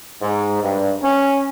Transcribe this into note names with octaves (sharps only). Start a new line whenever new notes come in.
G#2
G2
C#4